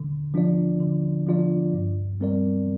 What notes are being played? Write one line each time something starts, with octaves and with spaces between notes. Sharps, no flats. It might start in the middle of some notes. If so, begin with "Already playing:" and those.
Already playing: D3
F3 D4 F4 D5
D3
F3 D4 F4 D5
G2
G3 C4 A#4 D5